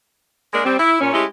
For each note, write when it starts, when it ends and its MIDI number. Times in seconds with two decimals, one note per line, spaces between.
0.52 0.64 56
0.52 0.64 58
0.52 0.64 62
0.52 0.64 68
0.52 0.64 70
0.65 0.76 55
0.65 0.76 60
0.78 0.98 64
1.00 1.08 46
1.00 1.08 61
1.13 1.24 56
1.13 1.24 57
1.13 1.24 61
1.13 1.24 64
1.13 1.24 67